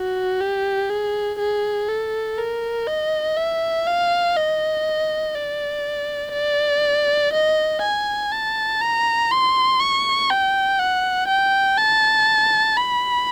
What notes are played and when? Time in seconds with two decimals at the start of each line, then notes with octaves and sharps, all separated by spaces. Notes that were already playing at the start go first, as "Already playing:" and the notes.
Already playing: F#4
0.40 G4
0.90 G#4
1.39 G#4
1.88 A4
2.38 A#4
2.87 D#5
3.37 E5
3.87 F5
4.36 D#5
5.35 D5
6.33 D5
7.33 D#5
7.82 G#5
8.32 A5
8.81 A#5
9.31 C6
9.80 C#6
10.30 G5
10.79 F#5
11.28 G5
11.78 A5
12.77 B5